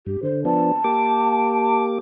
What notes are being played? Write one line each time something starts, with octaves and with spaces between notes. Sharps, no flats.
G2 G4
D3 C5
F3 B3 D4 A5
A#3 G4 D6